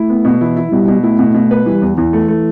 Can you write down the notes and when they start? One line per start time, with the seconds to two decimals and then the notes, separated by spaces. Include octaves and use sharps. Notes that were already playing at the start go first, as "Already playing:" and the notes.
Already playing: A3 E4
0.09 B3
0.25 B2
0.41 E3 E4
0.56 E4
0.72 B2 G3
0.88 B2
1.03 A3 E4
1.19 B2
1.34 B2
1.51 B4
1.66 E3 G3
1.82 E2
1.97 E2 E3
2.13 A3
2.28 A3